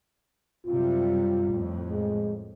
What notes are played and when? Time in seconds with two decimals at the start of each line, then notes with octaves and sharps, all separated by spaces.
0.67 F#2 C3 G3 F4
1.49 F2 A2
1.91 G#3